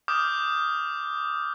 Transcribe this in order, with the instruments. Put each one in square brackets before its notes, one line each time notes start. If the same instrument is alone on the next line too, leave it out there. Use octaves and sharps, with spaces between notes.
[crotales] D6 D#6 F6 G6